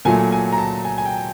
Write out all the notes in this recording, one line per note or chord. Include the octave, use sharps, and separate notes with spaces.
A#2 F#3 A3 G#5
G#5
A#5
A5
G#5
G#5
G5